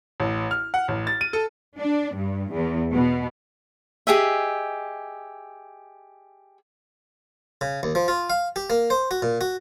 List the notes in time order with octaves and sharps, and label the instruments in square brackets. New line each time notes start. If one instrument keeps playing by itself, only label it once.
[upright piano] A1
F6
F#5
A1
A6
D#7
A4
[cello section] D4
G2
E2
B2
[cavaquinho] G4 G#4 D#5 E5
[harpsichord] C#3
D#2
F3
F4
F5
G4
A#3
C5
F#4
A#2
F#4